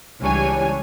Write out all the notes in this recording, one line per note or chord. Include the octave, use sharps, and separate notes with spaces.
C#2 E3 G3 D4 C#5 G#5